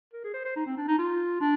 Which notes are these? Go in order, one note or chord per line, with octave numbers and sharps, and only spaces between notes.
A#4
G#4
C5
C5
D#4
C4
D4
D#4
F4
D4